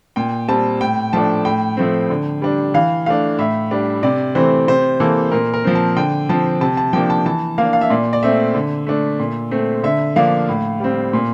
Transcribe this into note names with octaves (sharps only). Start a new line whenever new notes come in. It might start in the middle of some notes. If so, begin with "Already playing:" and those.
A#2 G5
G3 C4 A5
A2 G5
F3 A3 D4 A5
A2 G5
F3 A3 C4
D3
G3 D4
E3 F5
A3 D4 F5
A2 E5
G3 D4
C3 D5
E3 A3 C4 C5
C3 C5
E3 A#3 A4
A#2 A#4
A#4
F3 C4
A5
D3 G5
F3 C4 A5
C3 A5
A5
F3 A#3 D4 G5
A5
E3 A5
A#3 D4 F5
F5
E5
A#2 D5
D5
A3 C4 E5
D3
A3 D4
A#2
A3 C4
D3 E5
F3 A#3 D4 F5
A2
G3 C4
A#2